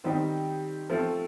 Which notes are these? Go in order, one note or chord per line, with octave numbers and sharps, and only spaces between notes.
D#3 G3 C4 D#4 G4
F3 A3 C4